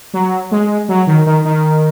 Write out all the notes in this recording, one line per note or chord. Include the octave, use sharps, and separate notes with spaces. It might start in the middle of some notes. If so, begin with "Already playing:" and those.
F#3
G#3
F#3
D#3
D#3
D#3